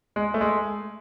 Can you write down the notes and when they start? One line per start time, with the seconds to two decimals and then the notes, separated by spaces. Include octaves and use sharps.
0.16 G#3
0.34 A3
0.41 G#3